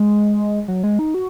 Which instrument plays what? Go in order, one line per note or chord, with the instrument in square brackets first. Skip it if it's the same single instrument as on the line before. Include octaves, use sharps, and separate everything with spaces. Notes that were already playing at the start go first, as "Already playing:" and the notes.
Already playing: [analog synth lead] G#3
F#3
G#3
D#4
F#4